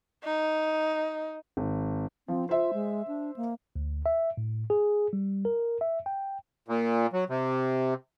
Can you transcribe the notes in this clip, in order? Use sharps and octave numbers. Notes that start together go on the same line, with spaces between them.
D#4
G#1
F3 C4
F4 C5 E5
G#3
D4
A#3
D2
E5
A2
G#4
G3
A#4
E5
G5
A#2
F#3
C3